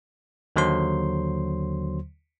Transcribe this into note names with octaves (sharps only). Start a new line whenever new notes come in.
D#2 D3 F#3 C5 C6